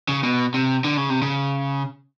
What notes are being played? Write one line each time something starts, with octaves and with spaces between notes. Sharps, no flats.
C#3
B2
C3
D3
C#3
C3
C#3